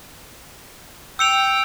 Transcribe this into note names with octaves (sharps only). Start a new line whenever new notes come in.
G5 E6 C#7 F7